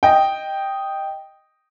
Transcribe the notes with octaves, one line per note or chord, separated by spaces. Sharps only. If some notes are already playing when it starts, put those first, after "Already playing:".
D#5 G5